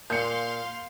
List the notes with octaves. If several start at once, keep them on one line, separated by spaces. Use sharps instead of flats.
A#2 F5 C6 G6 C#7